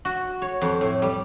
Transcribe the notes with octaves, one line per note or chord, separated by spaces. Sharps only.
F#4
C#5
F2
A2
G3